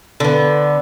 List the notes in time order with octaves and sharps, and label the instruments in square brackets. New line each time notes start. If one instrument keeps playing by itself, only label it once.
[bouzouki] D3 B3